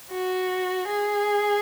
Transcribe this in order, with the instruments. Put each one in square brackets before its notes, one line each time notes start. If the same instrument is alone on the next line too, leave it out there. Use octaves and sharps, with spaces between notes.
[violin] F#4
G#4